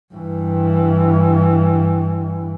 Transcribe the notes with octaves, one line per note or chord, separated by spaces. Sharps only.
G2 E3